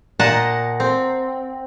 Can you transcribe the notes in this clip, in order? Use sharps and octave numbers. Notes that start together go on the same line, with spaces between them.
A#2 D#5 F#5 A5
C4